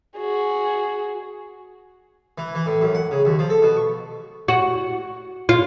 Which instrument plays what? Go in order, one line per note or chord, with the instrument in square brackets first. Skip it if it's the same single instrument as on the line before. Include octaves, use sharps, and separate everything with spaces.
[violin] F#4 G#4
[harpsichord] E3
E3
A2
F#2
F#5
C#3
D#2
F3
A4
B2
C#6
[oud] F#4
F4